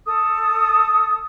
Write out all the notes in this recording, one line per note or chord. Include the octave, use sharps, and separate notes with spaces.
A4 D#6